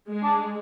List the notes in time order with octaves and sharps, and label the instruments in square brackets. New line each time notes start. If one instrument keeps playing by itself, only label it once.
[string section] G#3
[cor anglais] D4